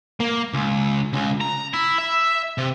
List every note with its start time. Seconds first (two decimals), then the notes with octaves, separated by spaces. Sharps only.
0.20 A#3
0.54 C#2
1.13 C#2
1.41 A#5
1.74 E4
1.98 E5
2.58 C3